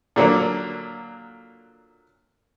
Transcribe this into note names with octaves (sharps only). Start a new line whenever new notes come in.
A#2 D3 F#3 A#3